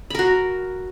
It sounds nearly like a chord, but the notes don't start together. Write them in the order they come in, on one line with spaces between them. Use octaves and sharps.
B5 A#4 F#4